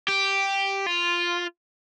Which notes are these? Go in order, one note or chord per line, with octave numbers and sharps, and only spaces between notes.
G4
F4